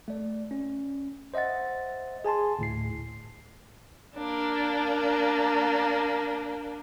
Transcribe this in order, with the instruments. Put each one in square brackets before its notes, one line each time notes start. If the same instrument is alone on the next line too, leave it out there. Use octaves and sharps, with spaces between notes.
[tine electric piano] A3 D5
C#4
C5 D#5 E5 F#5 A6
G#4 G#5 A5 C6
D2 A2 C7
[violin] A#3 D4